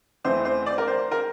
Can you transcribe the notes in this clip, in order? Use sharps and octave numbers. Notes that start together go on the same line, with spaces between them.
E2 E3 A3 C4 C5
C5
D5
A#4
C5
A#4